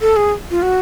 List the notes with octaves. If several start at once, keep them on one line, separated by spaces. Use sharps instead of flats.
A4
G#4
F4
F#4